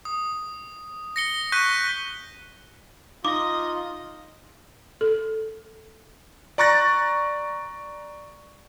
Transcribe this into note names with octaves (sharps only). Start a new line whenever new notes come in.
D#6
A#6 C#7 G7
C#6 F#6 G6 B6 D#7 G7
D#4 F4 D#5 D6
A4
D5 A#5 C#6 F#6 A6 A#6